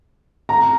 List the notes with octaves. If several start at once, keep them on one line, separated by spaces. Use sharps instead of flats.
A#5